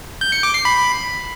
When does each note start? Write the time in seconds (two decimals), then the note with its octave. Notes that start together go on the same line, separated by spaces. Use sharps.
0.21 G6
0.32 C#7
0.43 D6
0.54 C7
0.65 B5